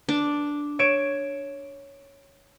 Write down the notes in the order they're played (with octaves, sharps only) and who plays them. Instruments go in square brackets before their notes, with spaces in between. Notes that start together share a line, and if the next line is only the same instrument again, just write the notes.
[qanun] D4
[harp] C#5 D7 E7